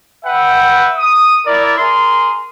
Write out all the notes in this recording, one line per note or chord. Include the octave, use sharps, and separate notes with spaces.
B4 E5 F#5 G5
D#6
E4 A#4 D5
G#4 A#4 C6